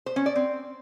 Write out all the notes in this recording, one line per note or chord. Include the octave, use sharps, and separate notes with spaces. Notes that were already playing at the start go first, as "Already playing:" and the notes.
C5
C#4
D5
C4